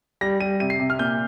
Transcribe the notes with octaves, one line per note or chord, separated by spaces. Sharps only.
G3 A#6
G3 D#7
C3 D#7
C7
C3
F6
A#2 G6